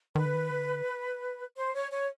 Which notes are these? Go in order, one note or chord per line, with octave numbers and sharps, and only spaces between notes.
D#3 B4
D3
D#3
D3
C5
C#5
C#5